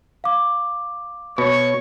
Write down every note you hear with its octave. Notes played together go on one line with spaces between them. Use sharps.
F5 D6
B2 C#5 C#6